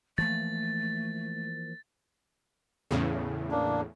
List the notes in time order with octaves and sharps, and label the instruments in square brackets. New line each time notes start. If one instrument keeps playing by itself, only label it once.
[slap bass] E3 F3 A#3 [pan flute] A3 [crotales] A6
[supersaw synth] E2 A2 C#3
[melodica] A#3 D4